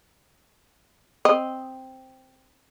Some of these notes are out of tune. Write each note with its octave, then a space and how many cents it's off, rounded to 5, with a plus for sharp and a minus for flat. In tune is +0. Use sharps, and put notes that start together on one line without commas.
C4 +0 D#5 +0